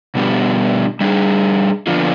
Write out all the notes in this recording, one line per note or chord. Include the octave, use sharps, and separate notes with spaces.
B2 G3 B3 D4 G4
G3 D4 G#4
D3 F3 B3 D4 F4